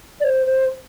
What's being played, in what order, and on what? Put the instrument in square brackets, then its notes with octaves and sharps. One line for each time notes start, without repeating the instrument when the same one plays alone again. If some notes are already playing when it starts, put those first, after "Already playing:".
[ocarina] D5
C5
C5